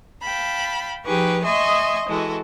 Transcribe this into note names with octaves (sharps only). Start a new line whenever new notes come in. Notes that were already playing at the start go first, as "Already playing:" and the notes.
F5 G5 A5 B5
F3 D#4 G4 G#4 B4 C#6
D#5 E5 G#5 C6 C#6 D#6
E3 G#3 F#4 A4